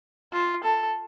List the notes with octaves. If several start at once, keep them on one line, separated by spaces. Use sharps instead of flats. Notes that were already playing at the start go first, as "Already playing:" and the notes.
F4
A4